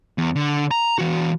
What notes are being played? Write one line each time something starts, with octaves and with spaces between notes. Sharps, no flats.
E2
D3
A#5
E3 F#4